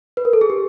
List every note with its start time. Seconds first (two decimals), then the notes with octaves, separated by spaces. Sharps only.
0.17 B4
0.25 A#4
0.33 A4
0.41 G#4
0.50 G4